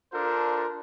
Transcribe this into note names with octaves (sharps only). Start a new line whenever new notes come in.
D4 F4 A4 A#4 C5